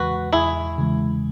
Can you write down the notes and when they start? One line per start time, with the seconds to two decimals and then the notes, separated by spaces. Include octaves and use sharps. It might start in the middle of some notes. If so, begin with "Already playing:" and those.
Already playing: E2 C#3 E3 G#3 F#4 B4
0.32 E2 E4 G#4
0.79 C#3 E3 G#3